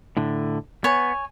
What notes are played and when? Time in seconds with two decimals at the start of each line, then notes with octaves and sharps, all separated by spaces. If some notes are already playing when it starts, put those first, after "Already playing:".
0.17 A2 D3
0.84 B3 C#5 G#5